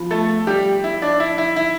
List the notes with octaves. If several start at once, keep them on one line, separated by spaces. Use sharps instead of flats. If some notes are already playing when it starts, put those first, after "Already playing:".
Already playing: F3 B3
A3 A4
G3 G4
E4
D4
E4
E4
E4